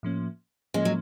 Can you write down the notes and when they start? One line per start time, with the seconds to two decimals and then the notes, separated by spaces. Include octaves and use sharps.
0.03 A2 F3 A#3 C#4
0.74 A2 F3 G#3 A#3 C#4
0.85 F#3